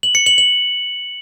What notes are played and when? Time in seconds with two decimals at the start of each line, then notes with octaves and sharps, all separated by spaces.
0.03 F#7
0.15 C#7
0.26 F#7
0.38 F#7